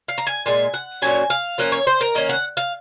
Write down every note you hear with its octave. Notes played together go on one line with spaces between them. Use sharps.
F5
A#5
G#5
A#2 G#3 G#5
F#5
A#2 F#3 C#4 G#5
F5
F3 A#3 C#4 F#5
C#5
C5
A#4
D#3 A#3 C#4 D#5
F#5
F5